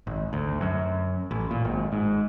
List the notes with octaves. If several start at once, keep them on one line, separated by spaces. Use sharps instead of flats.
G#1
D2
F#2
A1
A#2
G#1
G#2